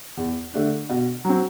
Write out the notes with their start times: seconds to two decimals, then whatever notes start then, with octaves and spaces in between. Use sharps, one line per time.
0.17 E2
0.54 D3 A3 D4
0.89 B2
1.25 F#3 C4